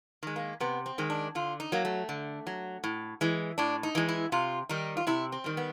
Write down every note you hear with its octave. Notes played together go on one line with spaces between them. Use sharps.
D#3 G#3
A#3
C3 B3
C4
D#3 G#3
D4
D3 F4
D#4
F#3 A#3
A3
D3
F#3
A2
E3 G#3
A2 D4
D#4
E3 G#3
E4
C3 F4
D#3 G3 D#4
F4
C3 E4
C4
D#3 G3
B3